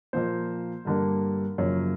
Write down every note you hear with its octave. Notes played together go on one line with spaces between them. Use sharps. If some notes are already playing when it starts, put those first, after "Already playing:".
A#2 F3 A#3 C5
G2 D3 G3 A#3 A#4
F#2 C#3 F3 A#3 C#5